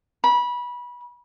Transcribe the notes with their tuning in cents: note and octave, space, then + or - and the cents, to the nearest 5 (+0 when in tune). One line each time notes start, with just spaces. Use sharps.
B5 -20